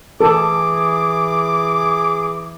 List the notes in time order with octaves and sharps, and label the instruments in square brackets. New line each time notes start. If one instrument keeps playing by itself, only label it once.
[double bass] E3 [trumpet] G#4 [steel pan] A4 [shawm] D6